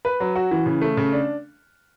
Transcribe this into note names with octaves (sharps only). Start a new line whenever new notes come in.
B4
F#3
F#4
E3
C#3
A3
C#3
D4